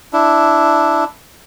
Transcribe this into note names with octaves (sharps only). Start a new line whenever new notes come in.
D4 E4